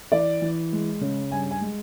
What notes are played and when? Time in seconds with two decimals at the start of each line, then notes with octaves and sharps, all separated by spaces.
0.12 E3 D5
0.42 E3
0.73 G#3
1.01 C#3
1.31 G2 G#5
1.51 G#5
1.61 G#3